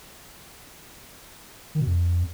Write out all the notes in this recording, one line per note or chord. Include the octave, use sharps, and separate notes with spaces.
D#3
B2
F2